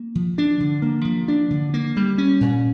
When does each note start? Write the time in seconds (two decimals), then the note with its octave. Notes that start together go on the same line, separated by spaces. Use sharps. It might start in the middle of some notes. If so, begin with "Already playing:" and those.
Already playing: A#3
0.15 F3
0.38 D4
0.60 D3
0.82 A#3
1.05 F3
1.28 D4
1.50 D3
1.74 A#3
1.97 G3
2.18 C#4
2.41 A#2